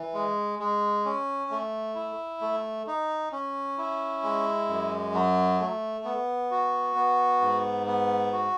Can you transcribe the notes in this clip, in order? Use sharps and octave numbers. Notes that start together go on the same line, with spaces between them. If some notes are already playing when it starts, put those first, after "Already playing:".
Already playing: E3
G#3
G#3
C#4
A3
E4
A3
D#4
C#4
E4
G#3
F#2
F#3
A3
B3
F#4
B3
G#2
B3
F#4